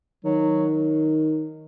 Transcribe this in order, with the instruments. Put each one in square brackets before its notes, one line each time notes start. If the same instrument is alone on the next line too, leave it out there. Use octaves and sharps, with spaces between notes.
[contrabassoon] D#3 [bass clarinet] F#3